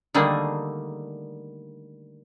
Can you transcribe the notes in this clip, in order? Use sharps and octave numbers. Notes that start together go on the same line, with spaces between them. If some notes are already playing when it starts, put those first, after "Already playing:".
D3 D#3 G3 A3 A#3 G#4